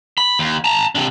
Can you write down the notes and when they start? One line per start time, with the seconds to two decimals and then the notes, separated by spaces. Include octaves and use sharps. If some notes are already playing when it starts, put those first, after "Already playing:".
0.18 B5
0.39 D#2
0.64 A5 A#5
0.95 C3 D4